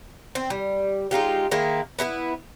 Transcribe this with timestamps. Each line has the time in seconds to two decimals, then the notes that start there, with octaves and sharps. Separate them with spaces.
0.35 C4
0.50 G3
1.11 G#3 D#4 F4 G4
1.51 D#3 G#3 A#3 E4
1.99 B3 E4 G#4 B4